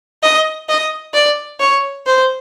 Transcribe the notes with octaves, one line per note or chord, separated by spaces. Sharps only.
D#5
D#5
D5
C#5
C5